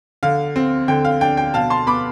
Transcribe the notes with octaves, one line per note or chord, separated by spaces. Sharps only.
D3 F5
C4
D3 G5
F5
D4 G5
G5
B2 F5 A5
A5 C6
B3 B5 D6